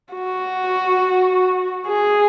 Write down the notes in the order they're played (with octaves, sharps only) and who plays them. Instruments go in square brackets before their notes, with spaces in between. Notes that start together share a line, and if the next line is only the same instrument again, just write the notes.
[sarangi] F#4
G#4